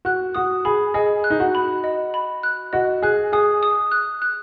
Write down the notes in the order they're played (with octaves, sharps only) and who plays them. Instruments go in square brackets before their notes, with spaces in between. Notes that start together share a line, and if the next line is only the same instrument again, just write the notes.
[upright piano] F#4 [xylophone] F#6
[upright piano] F#4 [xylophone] D#6
[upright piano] G#4 [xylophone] B5
[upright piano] G#4 [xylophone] D#5
[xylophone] F#6
[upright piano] D#4
F#4
[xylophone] B5
D#5
B5
F#6
[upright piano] F#4 [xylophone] D#5
[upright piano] G#4 [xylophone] F#6
[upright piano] G#4 [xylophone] D#6
[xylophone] D#6
F#6
F#6